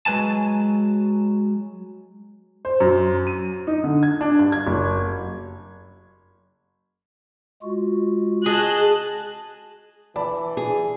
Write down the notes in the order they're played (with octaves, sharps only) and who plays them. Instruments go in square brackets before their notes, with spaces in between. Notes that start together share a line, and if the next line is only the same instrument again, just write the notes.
[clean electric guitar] F#3 G#3 B4 G#5 A5
[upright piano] C5
F#2
D#7
D#4
D3
G#6
D4
G2
G#6
F#1
[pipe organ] G#3 F4 F#4
[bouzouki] G#4 [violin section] D#5 A5 F#6
[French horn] E3 [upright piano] D5 A5 B5
[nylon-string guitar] G#4